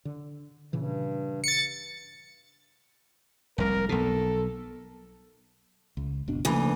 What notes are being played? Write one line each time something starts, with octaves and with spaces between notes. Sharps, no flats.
D3
G2 A#2 C#3 E3
A6 C#7
F1 C2 A#4
B1 B2 A4
C#2
F#1 B2 D4
D2 C#3 E3 F3 A#3